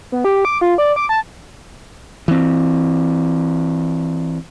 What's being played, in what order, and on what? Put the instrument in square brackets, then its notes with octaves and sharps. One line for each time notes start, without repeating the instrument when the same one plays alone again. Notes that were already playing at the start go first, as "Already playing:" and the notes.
[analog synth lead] B3
G4
D6
F4
D5
D6
A5
[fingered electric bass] E3 C4